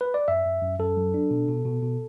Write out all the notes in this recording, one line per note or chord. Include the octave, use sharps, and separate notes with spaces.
B4
D5
F#2 E5
F#2
F#2
F#2 A4
F#3
D4
B2
B2
B2
B2